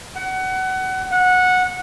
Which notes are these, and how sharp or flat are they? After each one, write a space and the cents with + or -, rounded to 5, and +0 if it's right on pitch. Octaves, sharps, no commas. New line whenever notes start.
F#5 +25
F#5 -15